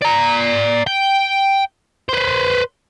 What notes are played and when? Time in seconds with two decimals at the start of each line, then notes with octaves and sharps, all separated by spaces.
0.02 D5 A#5
0.87 G5
2.09 B4 C5